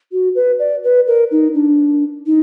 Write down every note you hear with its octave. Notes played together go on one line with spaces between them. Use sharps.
F#4
B4
D5
B4
A#4
D#4
D4
D#4